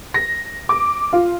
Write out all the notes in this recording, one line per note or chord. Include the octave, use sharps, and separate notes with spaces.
A#6
D6
F4